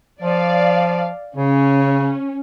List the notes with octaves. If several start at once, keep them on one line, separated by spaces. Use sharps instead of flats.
F3 D5 F5
C#3 C#4